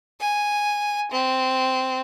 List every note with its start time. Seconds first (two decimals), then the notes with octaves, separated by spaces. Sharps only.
0.21 G#5
1.11 C4